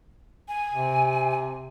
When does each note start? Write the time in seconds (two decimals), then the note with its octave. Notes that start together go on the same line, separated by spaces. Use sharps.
0.48 G#5
0.72 C3